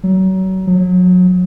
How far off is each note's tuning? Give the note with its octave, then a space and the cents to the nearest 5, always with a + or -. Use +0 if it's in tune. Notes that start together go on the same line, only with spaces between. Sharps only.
F#3 +30
F#3 -30